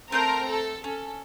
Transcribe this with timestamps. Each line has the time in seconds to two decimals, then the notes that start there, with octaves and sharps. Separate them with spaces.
0.12 A3 C4 A#4 A#5 C6 G6
0.50 A4
0.84 C#4 A4